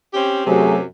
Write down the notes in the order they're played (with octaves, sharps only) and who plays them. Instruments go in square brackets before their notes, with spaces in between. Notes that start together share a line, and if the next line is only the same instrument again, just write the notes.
[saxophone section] C4 C#4 G4
[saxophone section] F#2 C3 [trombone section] F#3 A3 G#4